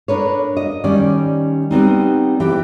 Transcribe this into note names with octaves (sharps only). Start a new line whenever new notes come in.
D4 A#4 B4 C#5
D#5
D#3 G3 C#4 D5
G3 B3 C4 D#4
E3 G4 G5